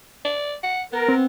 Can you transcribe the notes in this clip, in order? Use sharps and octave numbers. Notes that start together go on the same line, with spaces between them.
D5
F#5
B3 A#4
C4